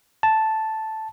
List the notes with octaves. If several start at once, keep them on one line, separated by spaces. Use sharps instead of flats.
A5